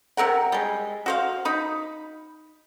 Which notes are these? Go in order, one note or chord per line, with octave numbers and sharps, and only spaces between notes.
C3 C4 A#4 F#5
G3 G#3
F#4 C5 F5
D#4 B5